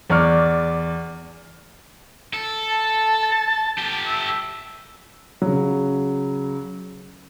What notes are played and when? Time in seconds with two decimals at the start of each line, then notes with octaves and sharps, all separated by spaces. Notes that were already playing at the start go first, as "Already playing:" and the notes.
0.10 E2 D5 C#6 F6
2.33 A4
2.70 A5
3.78 G4 A4
4.06 E5
5.42 C#3 F#3